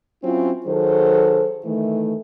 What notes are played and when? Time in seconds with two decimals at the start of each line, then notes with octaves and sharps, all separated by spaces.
0.23 F#3 C4 C#4 E4 F4
0.65 D#3 F#3 G#4 A4 C5
1.64 D#3 E3 A3